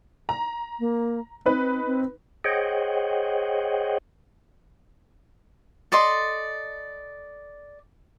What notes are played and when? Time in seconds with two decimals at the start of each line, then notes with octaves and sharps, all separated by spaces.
0.29 A#5
0.79 A#3
1.46 C4 D#4 B4
1.86 C4
2.44 G#4 C5 C#5 D#5 F#5 G5
5.92 A4 D5 D#5 C6